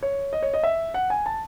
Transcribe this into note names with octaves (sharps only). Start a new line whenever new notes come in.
C#5
D#5
C#5
D#5
E5
F#5
G#5
A5